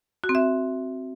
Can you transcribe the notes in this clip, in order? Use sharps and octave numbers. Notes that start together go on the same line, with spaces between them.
F#4
C4
E5